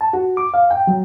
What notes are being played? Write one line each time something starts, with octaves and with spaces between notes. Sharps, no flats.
A5
F#4
D6
F5
G5
F#3